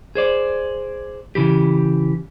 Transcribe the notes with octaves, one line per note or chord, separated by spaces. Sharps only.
G#4 C5 D5
C#3 E3 G4